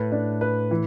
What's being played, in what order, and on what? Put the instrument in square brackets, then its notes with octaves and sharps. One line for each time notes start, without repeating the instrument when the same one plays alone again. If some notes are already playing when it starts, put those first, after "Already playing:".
Already playing: [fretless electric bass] A2 [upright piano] B4
[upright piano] D4
B4
E3